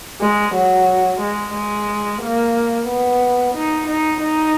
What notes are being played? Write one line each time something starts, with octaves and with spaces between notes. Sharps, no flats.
G#3
F#3
G#3
G#3
A#3
B3
D#4
D#4
D#4